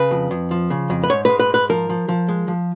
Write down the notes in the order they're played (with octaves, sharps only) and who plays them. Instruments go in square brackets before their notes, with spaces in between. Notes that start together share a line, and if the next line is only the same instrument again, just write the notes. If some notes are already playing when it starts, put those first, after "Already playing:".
Already playing: [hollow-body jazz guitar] C#3 B4
F2
F2
F3
C#3
F2
B4
G#2 C#5
G#3 B4
B4
G#2 B4
F3 A#4
F3
F3
G#3
F3